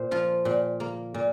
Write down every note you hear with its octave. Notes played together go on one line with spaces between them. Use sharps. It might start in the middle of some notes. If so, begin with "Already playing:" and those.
Already playing: A#2 C5
F3 F4
A#2
A#3
A#2